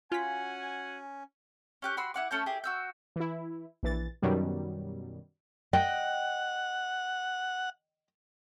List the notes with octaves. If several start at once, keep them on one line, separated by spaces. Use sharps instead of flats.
C#4 F4 F#4 F#5 G#5 B6
C#4 G4 F#6
F#4 B5 C6 E6
E4 F#5 D6
A3 C#4 A5 G6
E4 G4 G#4
F#4 E6 G6
E3 E4
A#1 E3 A6
F#2 B2 D#3 F#3 G3
D#5 F#5 G5